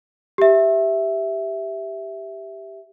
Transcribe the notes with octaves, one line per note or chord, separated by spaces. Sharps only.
G4 E5